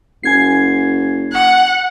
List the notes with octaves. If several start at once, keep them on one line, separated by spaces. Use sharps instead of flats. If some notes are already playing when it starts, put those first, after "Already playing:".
F#1 G#5 G#6 C7
F#5